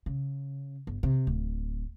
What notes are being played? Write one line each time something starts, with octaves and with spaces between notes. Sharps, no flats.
C#3
G1
C3
D1